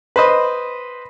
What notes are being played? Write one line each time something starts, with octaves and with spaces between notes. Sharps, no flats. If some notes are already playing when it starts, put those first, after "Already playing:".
B4 C5 D#5